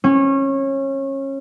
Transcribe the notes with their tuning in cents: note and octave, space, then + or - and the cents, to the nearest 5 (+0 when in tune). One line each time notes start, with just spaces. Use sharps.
C#4 -25